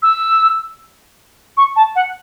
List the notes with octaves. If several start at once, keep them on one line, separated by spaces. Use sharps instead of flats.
E6
C#6
A5
F#5